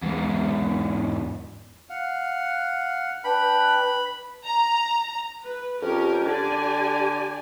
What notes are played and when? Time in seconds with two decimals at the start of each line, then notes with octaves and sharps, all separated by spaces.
0.02 E2 G#2
1.90 F5 F#5
3.24 D4 B4 G5 B5
4.45 A#5
5.42 B4
5.82 F2 C#4 G4 A#4
6.26 D3 G4 D5 G#5